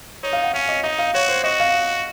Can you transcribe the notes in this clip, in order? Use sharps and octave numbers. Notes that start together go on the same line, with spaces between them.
D#4 C#5
F5
F#5
C#4 F5
D#5
D#4 D#5
F5
F#4 C#5
C5
F#4 D#5
F5